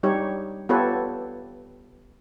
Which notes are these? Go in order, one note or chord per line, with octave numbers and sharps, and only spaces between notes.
G3 D#4 G4 C#5
B3 F4 G4 A4 B4 C#5